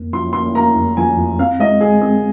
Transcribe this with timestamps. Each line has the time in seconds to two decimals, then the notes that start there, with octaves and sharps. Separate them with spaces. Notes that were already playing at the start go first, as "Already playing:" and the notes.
Already playing: F2 A#3
0.13 F3 C6
0.33 A#3 C6
0.55 A#3 A#5
0.76 F2
0.97 F3 G#5
1.17 F2
1.39 C4 F5
1.60 G#3 D#5
1.81 G#3 G#4
2.02 C4 G#4